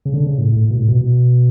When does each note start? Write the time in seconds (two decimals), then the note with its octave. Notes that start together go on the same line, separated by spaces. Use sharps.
0.05 C#3
0.14 D3
0.27 C#3
0.38 A2
0.52 A2
0.70 B2
0.76 A2
0.88 B2
1.01 B2